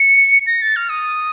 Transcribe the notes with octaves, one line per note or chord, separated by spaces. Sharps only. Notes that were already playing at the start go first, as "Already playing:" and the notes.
Already playing: C#7
A#6
A6
F6
D#6